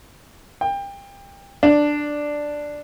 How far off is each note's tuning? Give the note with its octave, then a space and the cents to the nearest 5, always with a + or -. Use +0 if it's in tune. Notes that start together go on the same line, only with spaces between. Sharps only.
G5 +25
D4 +5